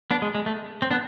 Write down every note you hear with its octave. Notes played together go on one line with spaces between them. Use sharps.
B3 D4
G#3
G#3
A3
C4
B3 D4